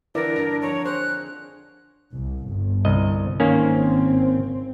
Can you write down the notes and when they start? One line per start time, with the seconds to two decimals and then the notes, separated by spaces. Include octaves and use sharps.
0.15 D3 E3 G3 E4 A#4 B4 D5
0.36 G2 D3 A#5
0.62 F2 C#5 A#5
0.86 G#4 C5 F#6
2.13 C2
2.48 G1
2.85 C2 D#5
3.40 G#1 D#3 A#3 C4 C#4